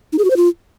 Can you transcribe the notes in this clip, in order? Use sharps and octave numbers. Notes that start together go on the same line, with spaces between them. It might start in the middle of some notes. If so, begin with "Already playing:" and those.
D#4
G#4
F#4
C5
F4